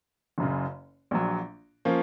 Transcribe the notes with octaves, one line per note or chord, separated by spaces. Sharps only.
F#1 F#2 C#3
A#1 A#2 F#3
F3 A#3 C#4